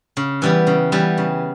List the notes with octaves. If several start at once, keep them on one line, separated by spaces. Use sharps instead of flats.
C#3
E3 G3 B3
C#3
E3 G3 B3
C#3